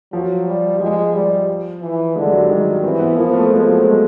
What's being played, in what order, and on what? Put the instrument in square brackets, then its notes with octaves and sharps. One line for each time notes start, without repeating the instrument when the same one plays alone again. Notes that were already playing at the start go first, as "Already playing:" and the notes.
[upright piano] F3 [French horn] F#3
[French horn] G3
[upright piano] F3 [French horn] G#3
[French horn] G3
E3
[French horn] D3 [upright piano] G#3
[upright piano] G3
F#3
G3
[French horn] D#3 [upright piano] G#3
[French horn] E3 [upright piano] C4
[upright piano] B3
[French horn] F3 [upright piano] A#3
[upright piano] A3
[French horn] F3 [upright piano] G#3
[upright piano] F#3
A3
G#3